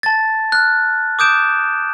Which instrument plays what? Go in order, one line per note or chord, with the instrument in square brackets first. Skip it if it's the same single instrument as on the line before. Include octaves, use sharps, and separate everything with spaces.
[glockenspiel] A5 A6
F6 F#6
D6 D#6 G6 D7 E7